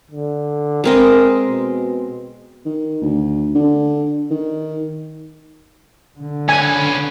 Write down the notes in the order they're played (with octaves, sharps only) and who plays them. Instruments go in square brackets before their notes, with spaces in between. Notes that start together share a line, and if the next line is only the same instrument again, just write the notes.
[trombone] D3
[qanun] G#3 C4 D#5 [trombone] A#4
[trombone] B2
[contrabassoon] D#3
D2
D3
D#3
[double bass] D3
[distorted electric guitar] C#4 B4 [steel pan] G#5